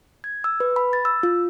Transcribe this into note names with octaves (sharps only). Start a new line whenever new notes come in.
G#6
E6
B4
B5
A6
E6
F4